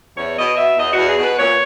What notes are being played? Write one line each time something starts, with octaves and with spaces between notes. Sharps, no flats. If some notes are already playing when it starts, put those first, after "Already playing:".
E2 C#5
B2 D#5
B2 E5
E2 D#5
E2 F#4
G#4
B2 B4
A#2 C#5